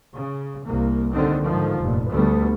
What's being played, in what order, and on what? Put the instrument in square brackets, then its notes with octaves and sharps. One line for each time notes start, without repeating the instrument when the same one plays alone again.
[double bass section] C#3
C2 A#3
D#2 D3 D#3 C4
G#2 D3 D#3 F3
F1 G2 A#2
D2 G3 A3 B3